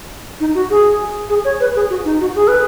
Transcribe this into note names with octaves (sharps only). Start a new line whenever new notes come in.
D#4
F#4
G#4
G#4
C#5
B4
G#4
F#4
D#4
F#4
G#4
B4